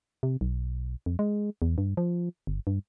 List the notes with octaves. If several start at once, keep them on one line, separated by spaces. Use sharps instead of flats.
C3
B1
F2
G#3
E2
G2
F3
G1
G2